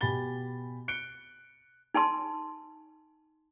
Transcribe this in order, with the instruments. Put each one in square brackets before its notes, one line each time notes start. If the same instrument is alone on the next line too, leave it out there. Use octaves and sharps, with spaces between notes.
[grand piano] B2 G4 G#5 B5 A6 G7
F#6 C#7 D7 G7
[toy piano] D#4 G#5 A5 C6